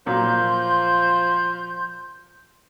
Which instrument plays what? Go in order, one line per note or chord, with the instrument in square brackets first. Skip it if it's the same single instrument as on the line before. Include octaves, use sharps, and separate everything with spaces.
[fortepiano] A#2 F#3 [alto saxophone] F3 [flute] C6 [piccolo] G6